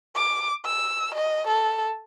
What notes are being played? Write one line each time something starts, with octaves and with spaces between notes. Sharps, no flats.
D6
E6
D#5
A4